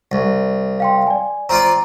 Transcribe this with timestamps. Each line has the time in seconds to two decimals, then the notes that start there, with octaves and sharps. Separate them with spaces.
0.12 C2
0.80 F5 G5 C6
1.07 D5 G#5
1.49 C4 F4 D5 A#5